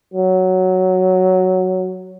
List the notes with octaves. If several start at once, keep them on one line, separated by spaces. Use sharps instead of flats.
F#3